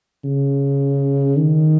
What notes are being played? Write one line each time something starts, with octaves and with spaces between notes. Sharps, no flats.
C#3
D#3